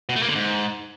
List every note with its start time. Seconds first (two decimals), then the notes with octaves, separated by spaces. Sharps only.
0.09 B2
0.16 A3
0.22 A#3
0.29 D3
0.35 G#2